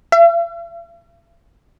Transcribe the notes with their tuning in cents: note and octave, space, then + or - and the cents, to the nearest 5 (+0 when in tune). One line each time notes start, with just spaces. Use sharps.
E5 +45